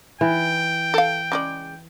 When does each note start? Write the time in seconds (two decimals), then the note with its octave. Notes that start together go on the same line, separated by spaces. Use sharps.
0.21 E3 G5
0.94 A4 F5
1.32 C#3 G#3 D5